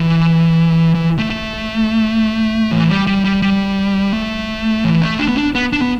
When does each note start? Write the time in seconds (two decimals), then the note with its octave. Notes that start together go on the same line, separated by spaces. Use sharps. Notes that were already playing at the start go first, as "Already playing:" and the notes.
Already playing: E3
0.95 E3
1.19 A3
1.30 A3
2.71 E3
2.89 G3
3.07 G3
3.24 G3
3.42 G3
4.13 A3
4.84 E3
5.02 A3
5.19 D4
5.28 B3
5.37 D4
5.55 B3
5.73 D4
5.81 B3